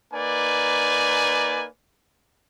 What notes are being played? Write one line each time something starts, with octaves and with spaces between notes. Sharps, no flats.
A#3 D#4 B4 D5 G#5